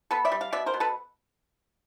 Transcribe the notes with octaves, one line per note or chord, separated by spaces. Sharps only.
B3 A4 B4
D5 E5
G3
F5
B2 D5 E5
A#4 C5
B2
A4 B4